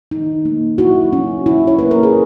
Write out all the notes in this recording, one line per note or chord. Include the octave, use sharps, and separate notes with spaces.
D#4
A#3
E4 F#4
C#4
E4
C#5
A#3 B4
A#4
G#4